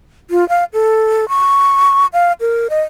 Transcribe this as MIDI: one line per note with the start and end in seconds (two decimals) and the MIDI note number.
0.31 0.47 65
0.49 0.64 77
0.73 1.28 69
1.29 2.06 85
2.13 2.33 77
2.40 2.68 70
2.70 2.81 75